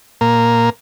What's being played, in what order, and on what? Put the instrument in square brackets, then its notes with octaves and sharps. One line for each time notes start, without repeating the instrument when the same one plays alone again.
[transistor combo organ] A#2 A#3